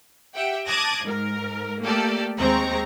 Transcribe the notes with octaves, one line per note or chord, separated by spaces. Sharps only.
G4 E5 F#5 G5
A5 D6 D#6 F#6 G#6 A#6
G#2 A#4
A3 A#3 G4 A4 D5
D#2 G#3 C4 A#5 C#6